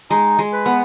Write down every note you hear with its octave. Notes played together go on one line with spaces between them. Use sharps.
G#3 D#4
G#3
B4
B3